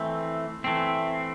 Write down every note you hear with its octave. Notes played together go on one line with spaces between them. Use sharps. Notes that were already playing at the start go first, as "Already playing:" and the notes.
Already playing: E3 A3 C4
E3 A3 C4